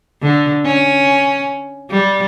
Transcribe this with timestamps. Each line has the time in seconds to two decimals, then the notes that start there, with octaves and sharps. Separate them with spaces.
0.22 D3
0.65 C#4
1.90 G3